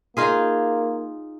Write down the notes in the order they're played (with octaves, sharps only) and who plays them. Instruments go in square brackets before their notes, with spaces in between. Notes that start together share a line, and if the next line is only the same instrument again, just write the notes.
[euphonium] A#3 [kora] D#4 F4 G#4